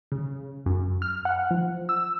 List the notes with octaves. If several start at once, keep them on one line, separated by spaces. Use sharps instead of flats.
C#3
F#2
F6
F#5
F3
E6